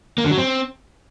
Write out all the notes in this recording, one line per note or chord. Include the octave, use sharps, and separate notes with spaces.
A#3
D3
F#3
C4